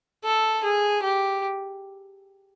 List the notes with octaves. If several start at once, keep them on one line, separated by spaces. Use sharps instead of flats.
A4
G#4
G4